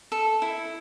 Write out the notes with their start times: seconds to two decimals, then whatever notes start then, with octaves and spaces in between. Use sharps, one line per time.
0.12 A4
0.42 E4